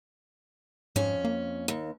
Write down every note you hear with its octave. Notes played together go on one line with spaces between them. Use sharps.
F2 G#2 C#4
A#3
D#2